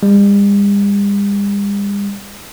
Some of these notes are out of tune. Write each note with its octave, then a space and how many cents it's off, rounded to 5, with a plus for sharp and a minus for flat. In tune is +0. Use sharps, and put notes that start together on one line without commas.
G3 +45